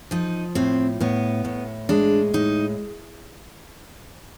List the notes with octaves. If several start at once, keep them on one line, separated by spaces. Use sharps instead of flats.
F3 D#4
A2 C4
A2 B3
A2
G#3 D4
A2 D#4